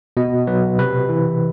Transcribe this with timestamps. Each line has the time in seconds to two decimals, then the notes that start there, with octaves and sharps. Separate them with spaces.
0.17 B2 D#5
0.47 F#3 B4
0.78 C3 B4
1.09 E3